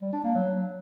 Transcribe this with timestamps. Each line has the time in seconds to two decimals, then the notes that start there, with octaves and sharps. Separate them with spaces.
0.01 G3
0.13 D4
0.24 A#3
0.35 F#3